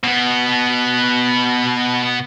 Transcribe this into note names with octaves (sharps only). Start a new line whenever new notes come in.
B2 B3